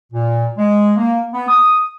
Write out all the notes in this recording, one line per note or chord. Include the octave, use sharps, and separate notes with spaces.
A#2
G#3
A#3
B3
D#6